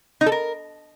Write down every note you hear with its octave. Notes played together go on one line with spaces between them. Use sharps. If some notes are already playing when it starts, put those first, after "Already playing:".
D#4
A4
A#4